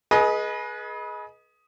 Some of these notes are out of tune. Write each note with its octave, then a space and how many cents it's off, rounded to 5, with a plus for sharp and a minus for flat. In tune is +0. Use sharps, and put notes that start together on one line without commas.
G#4 +25 B4 -25 D#5 +5